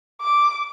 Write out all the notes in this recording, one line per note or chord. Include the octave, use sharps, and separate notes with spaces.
D6